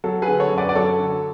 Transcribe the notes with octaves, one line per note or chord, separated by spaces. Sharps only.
F#3 A4
G#4 B4
D3
A4 C#5
F#2
B4 D5
D5
F#3 A4 C#5
D3